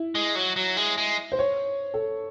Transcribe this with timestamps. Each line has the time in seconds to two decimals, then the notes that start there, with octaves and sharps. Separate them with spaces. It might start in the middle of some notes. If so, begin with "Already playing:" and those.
Already playing: E4
0.15 G#3
0.35 F#3
0.56 F#3
0.77 G#3
0.98 G#3
1.32 C5
1.39 C#5
1.94 A4